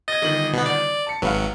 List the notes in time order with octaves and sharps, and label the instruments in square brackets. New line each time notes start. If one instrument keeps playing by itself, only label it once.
[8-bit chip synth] D#5 [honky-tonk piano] G#6 A6
[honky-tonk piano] G1 D#3 F#7
[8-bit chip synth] B2 B3
D5
[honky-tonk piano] A5 C#7
[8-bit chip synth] G#1 F#3 [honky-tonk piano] B4 F5